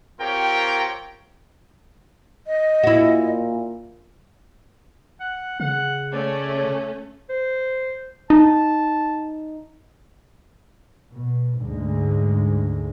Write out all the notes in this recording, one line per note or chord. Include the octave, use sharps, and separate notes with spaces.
C4 F4 G4 A#4 C#5 G5
D#5
A#2 E4 F#4
F#5
C#3 F#5
A3 C#4 D5
C5
D#4 A5
B2
D2 G#2 D3 G#3